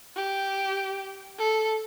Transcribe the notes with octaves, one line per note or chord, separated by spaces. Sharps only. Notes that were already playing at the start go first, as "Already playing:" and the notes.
G4
A4